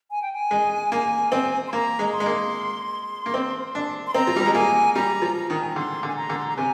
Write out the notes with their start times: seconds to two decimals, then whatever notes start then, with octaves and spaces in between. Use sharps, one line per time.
0.11 G#5
0.22 G5
0.33 G#5
0.51 G#3
0.92 A#3
1.32 C4
1.68 C6
1.73 A#3 A#5
1.99 G#3
2.13 C6
2.20 G#3
2.26 A#3
3.26 A#3
3.34 C4
3.75 D4
4.07 C6
4.14 C4 A#5
4.27 F3
4.36 G3
4.46 G#3
4.54 A#3 G#5
4.95 G3 A#5
5.22 F3
5.36 A#5
5.50 D#3
5.61 G#5
5.69 A#5
5.76 D3 C6
6.03 D3
6.08 G#5
6.16 A#5
6.30 D3
6.38 C6
6.48 A#5
6.57 C3 G#5